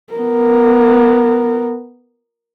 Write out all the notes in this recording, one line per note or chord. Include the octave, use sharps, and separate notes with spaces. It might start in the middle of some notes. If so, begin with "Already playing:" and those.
B3 A#4